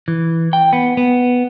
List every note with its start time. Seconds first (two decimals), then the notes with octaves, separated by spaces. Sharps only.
0.08 E3
0.53 G5
0.73 B3
0.97 B3